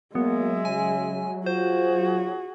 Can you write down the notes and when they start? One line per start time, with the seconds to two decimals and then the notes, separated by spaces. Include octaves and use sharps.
0.15 F#3 G#3 A#3 B3 E5
0.65 C#3 G#5
1.46 F4 F#4 G#4 C5